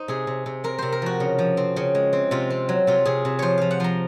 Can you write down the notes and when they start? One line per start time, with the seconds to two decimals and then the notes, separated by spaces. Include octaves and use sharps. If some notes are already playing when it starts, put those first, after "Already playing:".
Already playing: D#4 C5
0.08 C3 G#4
0.27 C3
0.46 C3
0.64 C4 A#4
0.78 C3 C5
0.92 A#4
1.02 F3 F#4
1.20 C#3
1.38 F3
1.57 C4
1.76 C#3
1.95 G#3
2.13 C4
2.31 C3 F4
2.50 C4
2.69 F#3
2.87 C3 F4
3.05 C3 G#4
3.25 C3
3.39 F3 C5 C#5
3.58 F3 F5
3.71 F#5
3.80 F3 A#5 C6